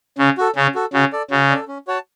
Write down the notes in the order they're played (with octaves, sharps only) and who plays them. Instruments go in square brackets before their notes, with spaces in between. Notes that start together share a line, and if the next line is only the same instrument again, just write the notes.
[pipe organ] C#3 [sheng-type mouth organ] C#4
[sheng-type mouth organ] F#4 A4
[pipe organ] C#3 [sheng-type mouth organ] C#4
[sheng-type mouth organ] F#4 A4
[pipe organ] C#3 [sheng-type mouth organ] F#4
[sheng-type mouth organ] A4 D5
[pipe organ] C#3 [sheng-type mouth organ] F#4
[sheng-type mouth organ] A4 D5
C#4
F#4 C#5 F#5 A5